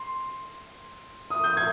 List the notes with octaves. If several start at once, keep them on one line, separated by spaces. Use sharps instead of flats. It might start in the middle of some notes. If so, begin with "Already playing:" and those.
Already playing: C6
D#6
G6
G#6